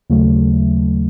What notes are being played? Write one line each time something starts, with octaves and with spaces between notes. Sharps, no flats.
D#2 C#3 F#3 A3